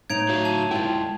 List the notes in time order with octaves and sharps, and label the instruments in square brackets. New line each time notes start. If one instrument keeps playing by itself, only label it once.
[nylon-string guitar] A2 D#4 [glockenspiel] G#6 D7 F7
[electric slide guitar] F#4 C#5 F5
[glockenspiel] A5
[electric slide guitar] G#3 E4 [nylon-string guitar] F4 G5